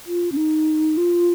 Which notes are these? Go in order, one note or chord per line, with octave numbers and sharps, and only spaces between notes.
F4
C#4
D#4
F4